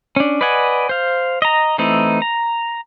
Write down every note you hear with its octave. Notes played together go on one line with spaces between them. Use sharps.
C#4 D4
B4 D5 D#5 F#5 G#5
C5 F5
D#5 A#5
E3 A3 C4 D#4 E4
A#5